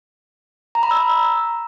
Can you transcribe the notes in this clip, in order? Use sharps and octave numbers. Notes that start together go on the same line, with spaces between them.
A#5
B5
E6